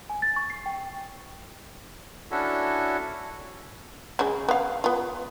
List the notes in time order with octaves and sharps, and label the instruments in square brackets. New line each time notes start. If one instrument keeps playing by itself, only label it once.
[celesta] G#5
A6
C#6
C7
G5
[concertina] C#4 D4 E4 F#4 A4
[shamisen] C#3 G#3
B3 F5
B3 F4